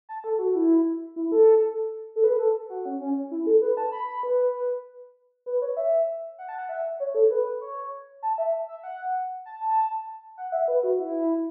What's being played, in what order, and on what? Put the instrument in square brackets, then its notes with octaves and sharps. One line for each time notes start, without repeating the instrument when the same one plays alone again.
[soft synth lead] A5
A4
F#4
E4
E4
A4
A4
B4
A4
F#4
C#4
C#4
E4
A4
B4
A5
B5
B5
B4
B4
C#5
E5
F#5
A5
F#5
E5
C#5
A4
B4
C#5
A5
E5
E5
F#5
A5
A5
F#5
E5
B4
F#4
E4